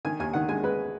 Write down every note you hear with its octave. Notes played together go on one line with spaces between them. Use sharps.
D#3 G#5
D#2 G#5
D#3 F#5
G#3 G#5
G#3 B4